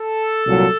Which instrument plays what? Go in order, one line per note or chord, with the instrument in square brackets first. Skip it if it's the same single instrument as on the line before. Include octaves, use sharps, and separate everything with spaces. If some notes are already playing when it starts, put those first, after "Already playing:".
Already playing: [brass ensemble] A4
C2 A#2 F#3